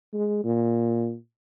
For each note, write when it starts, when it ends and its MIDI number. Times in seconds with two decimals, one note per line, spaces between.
0.13 0.42 56
0.44 1.15 46